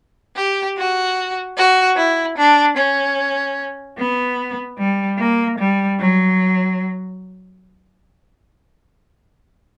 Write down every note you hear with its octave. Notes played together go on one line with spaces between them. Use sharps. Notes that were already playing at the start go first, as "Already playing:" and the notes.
G4
F#4
F#4
E4
D4
C#4
B3
G3
A#3
G3
F#3